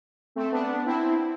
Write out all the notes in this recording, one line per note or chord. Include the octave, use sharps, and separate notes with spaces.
A3 C4
B3 D4
C4 E4